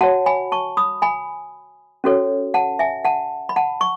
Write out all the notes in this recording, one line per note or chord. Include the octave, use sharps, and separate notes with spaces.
F#4 C#5 F#5 A5
G#5 B5
A5 C#6
B5 D#6
G#5 B5
C#4 F#4 A4 C#5
F#5 A5
E5 G#5
F#5 A5
B5
F#5 A5
C#6